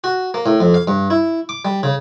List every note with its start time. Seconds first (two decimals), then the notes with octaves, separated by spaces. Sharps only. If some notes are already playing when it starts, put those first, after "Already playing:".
0.04 F#4
0.34 A#3
0.46 A2
0.60 F2
0.74 F5
0.87 G2
1.10 E4
1.49 D6
1.65 G3
1.83 C#3